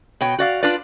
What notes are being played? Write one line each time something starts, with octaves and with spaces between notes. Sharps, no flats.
B2 C#5 G5
F#4 D5 F5
D4 F4 B4 D5